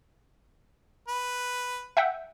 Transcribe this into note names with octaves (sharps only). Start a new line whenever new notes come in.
B4
E5 F#5 G5